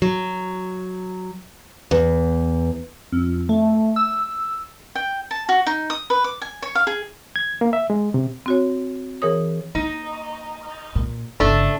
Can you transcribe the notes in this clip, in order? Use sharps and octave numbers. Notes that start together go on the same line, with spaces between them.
F#3
E2
F2
A3
E6
G5
A5
F#4
D#4
D#6
B4
D6
G#5
C#5
F5
G#4
G#6
A#3
E5
G#3
C3
C4 F#4 C#5
E3 G#4 A#4 C#5 D#6
A#3 D#4
A#2
G1 C#3 A3 D4 A4